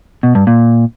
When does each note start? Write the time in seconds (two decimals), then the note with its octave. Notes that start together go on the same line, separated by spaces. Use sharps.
0.23 B2
0.35 G2
0.47 A#2